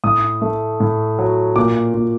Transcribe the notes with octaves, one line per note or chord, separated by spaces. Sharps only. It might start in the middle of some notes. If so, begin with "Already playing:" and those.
A2 D#6
A3
A2
F#3
A#2 D6
A#2